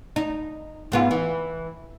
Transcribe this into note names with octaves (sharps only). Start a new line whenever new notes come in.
D#4
G#2 B3 F4
E3